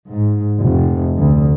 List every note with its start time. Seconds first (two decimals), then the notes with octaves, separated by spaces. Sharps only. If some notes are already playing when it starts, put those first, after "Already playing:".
0.10 G#2
0.62 F1
1.16 D2